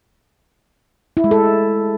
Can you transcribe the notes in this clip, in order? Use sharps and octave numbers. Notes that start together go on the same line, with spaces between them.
E4
G#3
A4